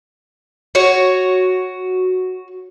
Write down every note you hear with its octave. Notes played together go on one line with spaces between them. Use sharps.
F#4 C#5